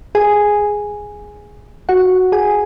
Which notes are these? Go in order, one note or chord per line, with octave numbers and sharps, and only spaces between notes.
G#4 G#5
F#4 F#5
G#4 G#5